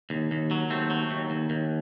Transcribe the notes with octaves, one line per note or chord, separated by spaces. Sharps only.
D#2
D#2
F#3
D#2 A3 C4
F#3
D#2
D#2
D#2